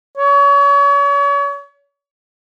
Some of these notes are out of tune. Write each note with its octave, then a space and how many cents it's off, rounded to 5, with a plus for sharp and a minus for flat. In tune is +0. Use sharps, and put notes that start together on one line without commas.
C#5 +35